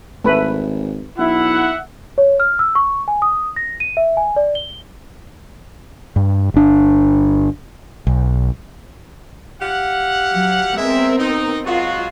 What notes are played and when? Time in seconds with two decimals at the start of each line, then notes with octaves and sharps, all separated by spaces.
0.24 G#1 A3 B4
1.18 B1 E4 E5 F#5
2.18 C#5
2.40 F6
2.59 E6
2.75 C#6
3.08 G#5
3.22 D#6
3.56 A#6
3.80 D#7
3.97 E5
4.17 G#5
4.36 D5
4.55 G7
6.16 G2
6.54 G1 D4
8.07 B1
9.62 G4 F5 F#5
10.33 F#3
10.77 G#3 B3 C4 A#4 E5
11.19 D#4
11.65 F#3 G#3 F4 F#4